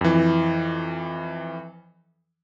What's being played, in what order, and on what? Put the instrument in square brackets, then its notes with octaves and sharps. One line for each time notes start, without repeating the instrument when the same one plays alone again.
[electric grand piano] F2 E3